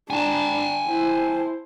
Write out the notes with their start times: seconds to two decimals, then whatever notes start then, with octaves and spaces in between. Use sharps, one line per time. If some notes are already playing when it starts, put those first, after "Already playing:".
0.10 D4 G#5 A5
0.88 E4 C5